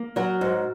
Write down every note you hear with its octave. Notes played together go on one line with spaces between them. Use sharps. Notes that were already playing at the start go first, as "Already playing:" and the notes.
Already playing: A#3
F#3 F#4 A#4
G#2